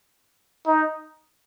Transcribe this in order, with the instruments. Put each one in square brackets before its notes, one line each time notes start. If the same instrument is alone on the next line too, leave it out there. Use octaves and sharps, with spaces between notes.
[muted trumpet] D#4